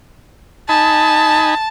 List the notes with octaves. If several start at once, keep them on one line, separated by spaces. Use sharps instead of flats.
D#4 G#5 A5 B5